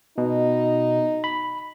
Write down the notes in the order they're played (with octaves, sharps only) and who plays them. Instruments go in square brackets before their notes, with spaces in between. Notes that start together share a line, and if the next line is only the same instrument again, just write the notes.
[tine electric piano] B2 [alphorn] D#4
[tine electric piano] B5